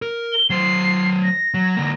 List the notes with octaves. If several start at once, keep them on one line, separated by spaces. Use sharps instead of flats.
A#4
G7
F#3 C5 C7
A#6
F#3
D3 A#3